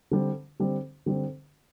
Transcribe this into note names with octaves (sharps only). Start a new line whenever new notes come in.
D3 G3 C4
D3 G3 C4
D3 G3 C4